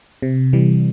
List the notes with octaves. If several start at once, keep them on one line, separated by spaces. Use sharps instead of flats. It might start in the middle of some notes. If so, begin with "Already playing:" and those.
C3
E3 G3